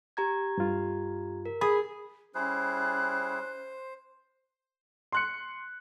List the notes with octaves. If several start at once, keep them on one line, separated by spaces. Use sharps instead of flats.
G4 A#5 G#6
G2 F4
A#4
G#4 B5
G3 C#4 E4 G#4 C5 F#6
C6 F#6 C#7